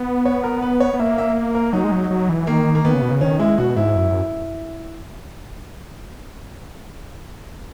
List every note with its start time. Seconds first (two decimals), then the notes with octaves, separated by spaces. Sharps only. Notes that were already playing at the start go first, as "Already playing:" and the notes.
Already playing: B3
0.25 C#5
0.43 A#4
0.62 B4
0.80 C#5
0.94 B3
0.99 A#3 E5
1.18 E5
1.55 A#4
1.73 F#3 D#4
1.84 G#3
1.92 F#3
2.11 F#3
2.29 E3
2.47 D#3 A#3
2.75 A#3
2.85 D#3 B3
2.93 C#3
3.02 B2
3.11 C#3
3.21 D#3 C#4
3.40 G#3 E4
3.58 B2 F#4
3.76 G#2 E4
3.96 F#2